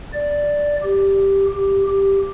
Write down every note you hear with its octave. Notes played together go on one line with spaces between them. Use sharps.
D5
G4
G4
G4